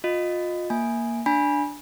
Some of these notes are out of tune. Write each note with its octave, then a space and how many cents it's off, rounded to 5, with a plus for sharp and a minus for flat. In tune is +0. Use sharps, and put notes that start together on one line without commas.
F4 +30 D#5 +0
A#3 +0 G#5 +0
D4 +0 G#5 +0 B5 -25